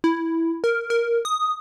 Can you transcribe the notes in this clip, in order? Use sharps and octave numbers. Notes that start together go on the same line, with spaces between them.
E4
A#4
A#4
D#6